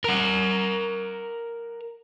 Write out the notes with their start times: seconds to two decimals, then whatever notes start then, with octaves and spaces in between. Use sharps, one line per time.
0.04 A#4 F#5